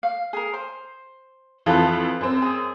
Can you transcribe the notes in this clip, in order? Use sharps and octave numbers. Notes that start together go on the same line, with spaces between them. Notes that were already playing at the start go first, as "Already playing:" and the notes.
F5
G#4 A#4
C5
F2 E3 F3 F4 A4 B4
F#2 C4
G#4